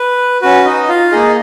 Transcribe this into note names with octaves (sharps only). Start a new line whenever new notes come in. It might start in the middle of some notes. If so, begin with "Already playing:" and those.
Already playing: B4
C#4 F#4 B4
D#4 D#5
F4 F5
A#3 D#4 G#4 D#5